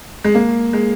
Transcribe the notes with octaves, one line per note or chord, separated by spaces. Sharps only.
G#3
A#3
G#3